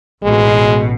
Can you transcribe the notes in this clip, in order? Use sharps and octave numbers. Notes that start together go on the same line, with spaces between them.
A1 B2 G#3